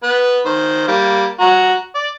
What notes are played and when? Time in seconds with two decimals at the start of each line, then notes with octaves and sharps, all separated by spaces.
0.03 B3 B4
0.45 D#3 C5
0.88 G3 A#3
1.40 F#4 A#5
1.95 D5